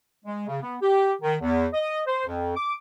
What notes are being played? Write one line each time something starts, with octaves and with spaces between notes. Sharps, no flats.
G#3
C#3
B3
G4
D#3
E2
D#5
C5
F2
D6